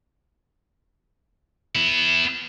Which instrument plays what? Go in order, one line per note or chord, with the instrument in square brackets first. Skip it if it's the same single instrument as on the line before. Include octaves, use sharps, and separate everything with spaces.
[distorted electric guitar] B3 E4